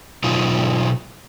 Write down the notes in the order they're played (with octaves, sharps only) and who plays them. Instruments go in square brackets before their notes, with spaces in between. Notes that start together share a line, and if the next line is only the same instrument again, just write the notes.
[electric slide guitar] B2 F#3 D#4 F4